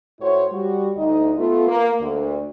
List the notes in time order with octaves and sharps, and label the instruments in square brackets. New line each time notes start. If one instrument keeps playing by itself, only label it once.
[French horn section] A2 E4 F#4 C5 C#5
G3 F#4
D2 D#4 D#5
A3 B3 F4
A#3
D2